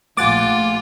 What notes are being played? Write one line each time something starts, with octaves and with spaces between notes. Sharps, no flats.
A#1 A3 F4 F#5 G#5 D6 A6